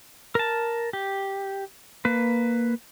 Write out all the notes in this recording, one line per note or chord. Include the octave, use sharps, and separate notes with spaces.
A#4 A5
G4
A#3 B4